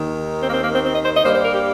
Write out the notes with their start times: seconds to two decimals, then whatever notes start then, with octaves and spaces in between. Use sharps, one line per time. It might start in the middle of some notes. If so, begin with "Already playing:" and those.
Already playing: D#2 D#3
0.42 C4
0.48 A#3
0.53 C4
0.63 A#3
0.74 C4
0.84 C4
0.94 D#5
1.04 C5
1.15 D#5
1.24 G2 G3 A#3 C5
1.35 C5
1.45 A#4
1.54 G4